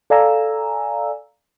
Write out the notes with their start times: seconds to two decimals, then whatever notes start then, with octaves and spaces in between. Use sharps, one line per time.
0.10 A4 D5 F5 G#5 A#5 E6